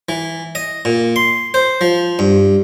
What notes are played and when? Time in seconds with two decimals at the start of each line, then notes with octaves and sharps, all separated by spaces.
0.09 E3
0.55 D#5
0.85 A#2
1.16 C6
1.54 C5
1.81 F3
2.19 G2